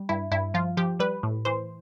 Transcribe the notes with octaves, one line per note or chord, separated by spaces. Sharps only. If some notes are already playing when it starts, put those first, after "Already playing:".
Already playing: G3
G2 E4
G2 E4
F3 F4
F3 G4
G3 B4
A2
E3 C5